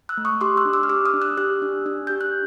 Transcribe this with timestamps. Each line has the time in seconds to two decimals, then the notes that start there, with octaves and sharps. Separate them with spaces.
0.09 E6 F#6
0.17 A3
0.25 C#6 D#6
0.41 G4 C6 D6
0.57 E6 F#6
0.65 D4
0.73 D6 E6
0.83 F6
0.90 G4 D6 E6
1.06 D#6 F6
1.14 D4
1.21 E6 F#6
1.37 G4 E6 F#6
1.62 D4
1.86 D4
2.07 G4 G6
2.21 F#6